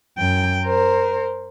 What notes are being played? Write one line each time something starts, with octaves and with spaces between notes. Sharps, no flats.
F#2 G5
A#4 C5